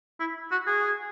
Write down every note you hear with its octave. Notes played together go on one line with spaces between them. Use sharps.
E4
F#4
G#4